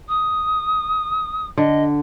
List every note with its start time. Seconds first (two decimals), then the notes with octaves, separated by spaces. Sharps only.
0.08 D#6
1.58 D3 D#5